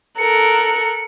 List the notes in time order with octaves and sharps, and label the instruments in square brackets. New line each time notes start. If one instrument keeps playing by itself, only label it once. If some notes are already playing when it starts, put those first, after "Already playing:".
[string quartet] A4 A#4 F#6 [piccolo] C#7